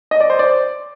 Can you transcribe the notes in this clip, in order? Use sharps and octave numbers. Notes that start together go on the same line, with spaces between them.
D#5
D5
C5
D5